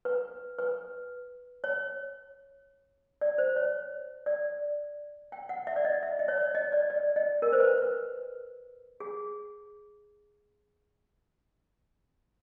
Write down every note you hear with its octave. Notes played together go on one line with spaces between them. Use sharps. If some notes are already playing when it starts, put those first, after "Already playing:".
B4
B4
C#5
D5
C5
C#5
D5
G5
F#5
E5
D5
D#5
E5
D#5
C#5
D5
D#5
D5
D5
D#5
A#4
C5
B4
B4
G#4